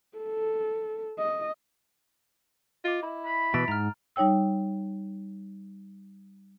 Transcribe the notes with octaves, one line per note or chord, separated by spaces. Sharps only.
A4
D#5
F4 D#5 D6
E4
B5
B2 E3 A6 D7
G#2 A#5 F6
G3 D#4 C#5 G5 E6